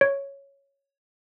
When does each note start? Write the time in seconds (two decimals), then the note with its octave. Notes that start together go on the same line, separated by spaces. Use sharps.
0.01 C#5